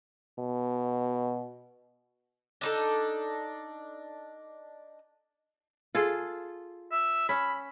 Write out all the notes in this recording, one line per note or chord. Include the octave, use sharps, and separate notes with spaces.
B2
D4 D#4 A4
F4 G#4 A4
E5
C#4 B5